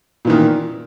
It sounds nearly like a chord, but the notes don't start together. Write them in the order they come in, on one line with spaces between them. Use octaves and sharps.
A#2 E3 D#3